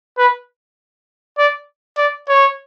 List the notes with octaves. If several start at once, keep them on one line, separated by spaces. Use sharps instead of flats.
B4
D5
D5
C#5